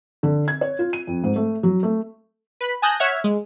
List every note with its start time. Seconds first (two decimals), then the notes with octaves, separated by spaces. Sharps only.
0.23 D3
0.48 G#6
0.61 C#5
0.79 F4
0.93 D#7
1.07 F2
1.24 G#2
1.36 A3
1.63 F#3
1.83 A3
2.61 B4 B5
2.82 G#5 A5 D#6 F#6 G6 A#6
2.99 C#5 E5 F#5 F6 G#6
3.24 G#3